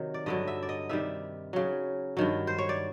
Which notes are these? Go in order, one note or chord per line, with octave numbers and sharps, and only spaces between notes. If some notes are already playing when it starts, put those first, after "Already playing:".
Already playing: C3 D#3 F#3
D5
G2 D3 F#3 D#5
E5
D5
D#5
C3 D#3 G3 E5
C#3 F#3
G2 D#3 F#3
C5
C#5
D5